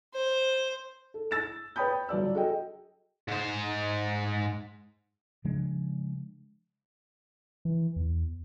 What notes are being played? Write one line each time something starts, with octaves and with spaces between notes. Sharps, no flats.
C5
A4
E6 A6 E7
B4 C#5 G5 B5 D#6 G6
G1 F#3 D5 E6
F#4 G#4 A4 D#5 G5
G#2 C5
C#3 F3 G#3 D4
E3
E2